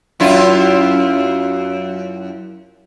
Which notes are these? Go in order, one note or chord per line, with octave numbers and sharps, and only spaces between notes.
F#2 E4 F4